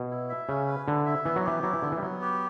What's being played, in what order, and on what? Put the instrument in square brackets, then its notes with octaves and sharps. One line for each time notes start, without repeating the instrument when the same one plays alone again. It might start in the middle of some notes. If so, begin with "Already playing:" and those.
Already playing: [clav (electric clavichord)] B2
[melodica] E4
E5
[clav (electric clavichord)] C#3 [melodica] C#4
[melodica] B4
[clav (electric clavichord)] D3 [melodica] E4
[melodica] E5
[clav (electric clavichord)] E3 [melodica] B3
[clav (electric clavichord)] F#3
[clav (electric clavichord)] E3 [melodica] G4
[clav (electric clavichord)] F#3 [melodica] E4
[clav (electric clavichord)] E3
[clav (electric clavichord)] D3 [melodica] B3
[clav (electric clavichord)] E3
G3
[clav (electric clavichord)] F#3 [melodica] B3
[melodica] G4